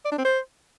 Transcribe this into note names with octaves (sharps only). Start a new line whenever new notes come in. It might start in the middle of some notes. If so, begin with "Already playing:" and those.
D5
D4
C4
C5